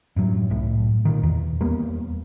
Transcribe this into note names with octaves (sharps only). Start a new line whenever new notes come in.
F#2 A2 F#3
C2 A2
A#2 D#3
E2
E2 G3 A#3 B3